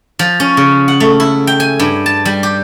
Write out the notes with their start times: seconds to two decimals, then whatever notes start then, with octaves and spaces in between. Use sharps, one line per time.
0.19 F3
0.40 C#4
0.57 C#3
0.88 F#5
1.00 A3
1.20 E4
1.47 G5
1.60 G#5
1.79 G2
2.06 A5
2.25 G3
2.43 G4